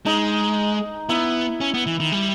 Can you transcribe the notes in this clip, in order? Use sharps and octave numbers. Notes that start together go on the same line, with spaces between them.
G#3 D#4
B3 E4
C#4
B3
E3
D#3
G3